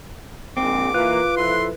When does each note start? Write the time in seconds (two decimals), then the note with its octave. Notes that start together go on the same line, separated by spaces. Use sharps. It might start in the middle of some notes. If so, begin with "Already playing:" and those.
0.57 A#1 G#2 C4 D6
0.94 E3 A#3 F4 B4
1.36 F3 E4 A4 C6